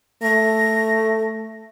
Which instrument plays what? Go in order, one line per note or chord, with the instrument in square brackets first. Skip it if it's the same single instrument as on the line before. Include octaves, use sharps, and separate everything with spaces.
[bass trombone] A3 [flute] A#6